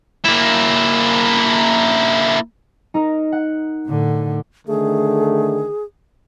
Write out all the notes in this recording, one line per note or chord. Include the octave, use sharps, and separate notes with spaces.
A#3 E4
D#4 A#4
F#5
A2 D3
D3 D#3 A3 G#4